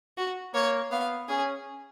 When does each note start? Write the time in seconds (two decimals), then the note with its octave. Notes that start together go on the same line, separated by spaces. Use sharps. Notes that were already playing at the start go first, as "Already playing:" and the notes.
0.18 F#4
0.54 A#3 C#5
0.91 B3 F5
1.28 C#4 G#4